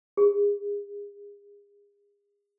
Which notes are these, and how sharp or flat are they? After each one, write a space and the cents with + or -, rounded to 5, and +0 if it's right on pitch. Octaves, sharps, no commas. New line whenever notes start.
G#4 -35